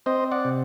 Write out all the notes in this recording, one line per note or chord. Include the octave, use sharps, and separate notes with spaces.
C4 C5 D#5
D5 F#5
C3